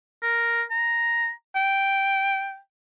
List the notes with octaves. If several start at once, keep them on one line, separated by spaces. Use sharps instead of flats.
A#4
A#5
G5